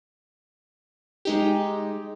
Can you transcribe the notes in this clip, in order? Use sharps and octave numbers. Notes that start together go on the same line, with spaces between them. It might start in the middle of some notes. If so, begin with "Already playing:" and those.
G#3 D#4 G4